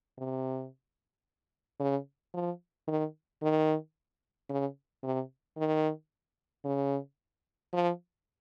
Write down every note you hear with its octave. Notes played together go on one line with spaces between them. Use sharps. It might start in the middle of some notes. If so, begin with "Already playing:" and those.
C3
C#3
F3
D#3
D#3
C#3
C3
D#3
C#3
F3